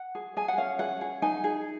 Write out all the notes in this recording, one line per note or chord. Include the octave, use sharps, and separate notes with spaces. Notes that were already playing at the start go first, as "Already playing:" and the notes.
Already playing: F#5
G#4
G#4 G#5
F#5
C#4 F5
G#4 F#5
G#4
D#4 G#5
G#4